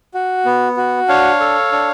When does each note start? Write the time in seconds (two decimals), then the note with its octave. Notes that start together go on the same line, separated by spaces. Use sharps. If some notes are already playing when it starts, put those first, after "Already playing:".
0.14 F#4
0.45 B3
0.77 F#4
1.08 D4 C#5 F5
1.40 A4
1.72 D4